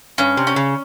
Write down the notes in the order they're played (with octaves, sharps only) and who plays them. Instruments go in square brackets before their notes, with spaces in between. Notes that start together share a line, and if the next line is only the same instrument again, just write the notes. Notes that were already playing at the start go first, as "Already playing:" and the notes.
[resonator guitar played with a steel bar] G2 [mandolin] C#4
[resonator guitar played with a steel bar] C3
[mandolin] C#4
[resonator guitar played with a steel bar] C#3